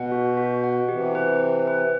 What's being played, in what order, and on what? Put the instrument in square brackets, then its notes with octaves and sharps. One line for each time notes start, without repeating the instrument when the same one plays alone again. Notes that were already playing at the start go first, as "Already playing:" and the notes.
Already playing: [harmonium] B2 [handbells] F#5
[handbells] F#4
F#4
F#5
[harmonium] C3 E3 [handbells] G4
[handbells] B4
B4
B4